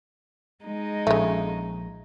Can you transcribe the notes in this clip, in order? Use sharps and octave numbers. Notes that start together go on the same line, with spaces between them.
G#3 D#4
A#1 C#3 A3